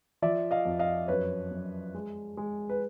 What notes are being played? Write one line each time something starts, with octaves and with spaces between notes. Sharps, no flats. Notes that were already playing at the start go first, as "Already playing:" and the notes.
F3 D5 E5
D#5 F5
F2
D#5 F5
F#2 B4 C#5
F#2
G#3
G#3
B4